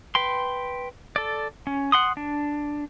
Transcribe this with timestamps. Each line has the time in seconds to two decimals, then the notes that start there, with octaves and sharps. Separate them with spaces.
0.15 B4 G5 C6
1.16 A4 D5
1.67 C#4
1.92 F#5 C6 D#6
2.17 D4